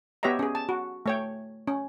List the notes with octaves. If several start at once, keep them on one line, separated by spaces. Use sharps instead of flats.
B3 G4 C#5 D#5 E5 A#5
C#4 G#4
A5
F#4
A3 C#5 G5
C#4